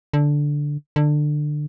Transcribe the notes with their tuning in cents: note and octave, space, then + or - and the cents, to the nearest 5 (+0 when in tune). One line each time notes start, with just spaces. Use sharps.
D3 -5
D3 +20